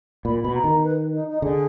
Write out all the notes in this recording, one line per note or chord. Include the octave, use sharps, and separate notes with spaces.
A#2 B5
B2 B5
A#5
D#3
B4
D#4
D#4
D3 G#4